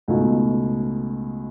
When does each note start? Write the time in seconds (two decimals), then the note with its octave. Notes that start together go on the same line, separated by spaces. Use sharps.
0.08 C#2 B2 A3 D#4